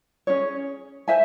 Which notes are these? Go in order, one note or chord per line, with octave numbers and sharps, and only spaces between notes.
C#4 G#4 C#5
C5 E5 G#5